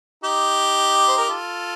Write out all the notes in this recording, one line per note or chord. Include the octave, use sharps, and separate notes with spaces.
D#4 G4
C5
A#4
F4 A4